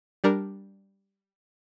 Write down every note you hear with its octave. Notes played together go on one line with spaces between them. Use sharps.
G3 D4 A#4